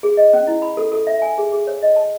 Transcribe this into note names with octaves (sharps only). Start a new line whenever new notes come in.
G#4
D#5
C#4
E4
B5
A4
A4
E5
G#5
G#4
G#4
C#5
D#5
A5